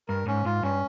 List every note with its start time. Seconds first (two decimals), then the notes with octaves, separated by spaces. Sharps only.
0.08 G2 A#4
0.26 G#2 C#4
0.45 G#2 F4
0.62 G2 C#4